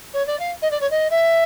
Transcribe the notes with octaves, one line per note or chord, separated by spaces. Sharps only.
C#5
D5
F5
D#5
D5
C#5
D#5
E5